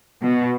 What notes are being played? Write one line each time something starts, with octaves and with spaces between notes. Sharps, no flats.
B2